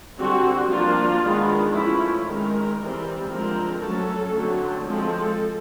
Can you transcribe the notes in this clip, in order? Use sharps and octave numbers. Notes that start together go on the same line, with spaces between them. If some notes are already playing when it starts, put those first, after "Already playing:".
D3 G3 C4 F#4
F3 A#3 D4 F4
D#3 G#3 B3 D4
F3 A3 C#4 E4
D#3 G#3 C4 A#4
E3 G3 C4
D3 F3 G#3 C4 A#4
F#3 A3 C#4 A4
D3 F#3 A3 C4
F3 G#3 C4 A4